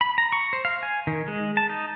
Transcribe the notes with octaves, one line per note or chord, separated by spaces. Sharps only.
B5
A#5
C#6
C5
F5
G#5
D#3
G#3
A5
D#4